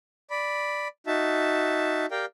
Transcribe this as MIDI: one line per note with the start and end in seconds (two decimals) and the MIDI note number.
0.30 0.88 74
0.30 0.88 83
1.07 2.06 63
1.07 2.06 66
1.07 2.06 76
1.07 2.06 81
2.11 2.26 67
2.11 2.26 70
2.11 2.26 74
2.11 2.26 77
2.11 2.26 79